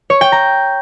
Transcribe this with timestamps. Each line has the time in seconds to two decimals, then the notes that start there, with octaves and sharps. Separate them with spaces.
0.10 C#5
0.21 G5
0.32 A#5